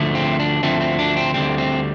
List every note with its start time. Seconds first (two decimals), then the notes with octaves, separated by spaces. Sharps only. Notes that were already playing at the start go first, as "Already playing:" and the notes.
Already playing: D2 D3 F3 A3
0.15 C4
0.40 D4
0.63 D2 D3 F3 A3 C4
0.81 C4
0.99 D4
1.17 C4
1.34 D2 D3 G3 C4
1.58 C4